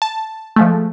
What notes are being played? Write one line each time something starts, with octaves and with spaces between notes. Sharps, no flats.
A5
F3 G#3 A3